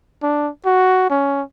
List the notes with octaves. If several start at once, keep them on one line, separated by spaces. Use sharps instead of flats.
D4
F#4
C#4